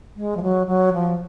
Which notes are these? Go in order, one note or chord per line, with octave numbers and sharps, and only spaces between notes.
G#3
F3
F#3
F#3
F3